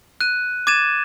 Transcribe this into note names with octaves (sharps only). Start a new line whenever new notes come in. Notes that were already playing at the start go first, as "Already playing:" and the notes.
F#6 D#7
D6 G#6 A6 D#7 E7